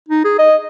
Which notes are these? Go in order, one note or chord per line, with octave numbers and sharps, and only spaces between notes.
D#4
G#4
D#5